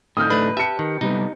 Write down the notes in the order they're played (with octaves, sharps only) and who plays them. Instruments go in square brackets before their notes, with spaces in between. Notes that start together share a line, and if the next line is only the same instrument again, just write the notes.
[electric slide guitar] A2 D3 D#4 [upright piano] D#6 F6 G6
[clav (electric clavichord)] A3 D4 [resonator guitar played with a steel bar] B4
[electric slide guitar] G4 [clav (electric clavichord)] E5 [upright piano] A5 C#7
[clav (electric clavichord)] D#3
[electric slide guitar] C3 G3 B3 [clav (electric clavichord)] D#4